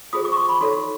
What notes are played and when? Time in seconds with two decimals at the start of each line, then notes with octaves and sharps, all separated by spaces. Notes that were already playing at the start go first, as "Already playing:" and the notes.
0.13 F4 G#4 C5 D#6
0.25 D6
0.32 C#6
0.37 C6
0.49 B5
0.61 D#4 F#4 A4 C#5 C6